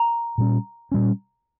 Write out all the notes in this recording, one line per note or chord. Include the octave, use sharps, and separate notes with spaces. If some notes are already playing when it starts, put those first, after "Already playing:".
Already playing: A#5
A#2 G3 C#4
A#2 G3 C#4